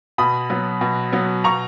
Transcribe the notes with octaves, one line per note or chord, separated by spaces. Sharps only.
B2 B5 D#6
F#3 B3
B2
F#3 B3
B2 A#5 C#6